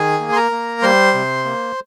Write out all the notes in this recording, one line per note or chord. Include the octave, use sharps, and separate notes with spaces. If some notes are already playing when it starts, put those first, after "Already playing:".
Already playing: D#3 G#4 G#5
A#3
C6
A#4 A#5
A#3
G3 C5 C6
C3
A#3